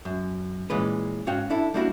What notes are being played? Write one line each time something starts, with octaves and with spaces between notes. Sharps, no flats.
F#2
A#2 E3 G#3 C#4 B4
G#2 C#4 F#4 F5 G5
D4 E4 A4
G3 A#3 D4 E4 F#4